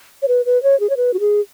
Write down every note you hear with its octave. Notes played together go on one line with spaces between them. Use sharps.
C#5
B4
B4
C#5
G#4
C#5
B4
F#4
G#4